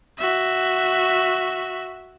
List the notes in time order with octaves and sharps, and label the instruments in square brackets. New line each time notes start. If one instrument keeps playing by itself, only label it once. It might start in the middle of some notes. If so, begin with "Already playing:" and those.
[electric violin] F#4 E5